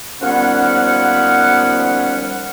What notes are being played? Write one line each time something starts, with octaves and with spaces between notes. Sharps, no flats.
D#2 F3 G3 B3 C#4 F#5